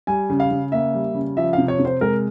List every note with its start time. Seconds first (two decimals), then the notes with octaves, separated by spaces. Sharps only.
0.07 G3 G#5
0.30 C#3
0.40 F5
0.51 C#3
0.72 A#3 E5
0.94 G3
1.14 C#3
1.37 F3 E5
1.53 C3 F5
1.68 C#5
1.79 C3
1.85 C5
2.01 G#3 A#4